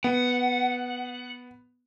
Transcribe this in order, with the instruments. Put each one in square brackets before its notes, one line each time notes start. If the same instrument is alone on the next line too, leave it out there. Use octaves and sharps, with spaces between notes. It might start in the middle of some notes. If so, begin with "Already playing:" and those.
[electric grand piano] B3 [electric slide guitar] F#5